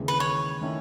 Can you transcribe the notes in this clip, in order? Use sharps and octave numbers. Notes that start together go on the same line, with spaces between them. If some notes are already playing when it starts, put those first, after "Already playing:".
Already playing: D#2 C#3 E3 G#3
B4
C#5
D#3 A3 C#4 E4